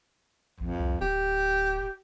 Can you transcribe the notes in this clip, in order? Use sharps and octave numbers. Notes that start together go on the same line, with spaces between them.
A#1 F2
C2
D1 G4